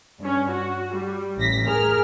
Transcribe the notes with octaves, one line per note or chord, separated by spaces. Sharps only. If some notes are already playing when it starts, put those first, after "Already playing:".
G2 C#4
F#4
G3
A1 A#6 B6
G#4 A#4 F6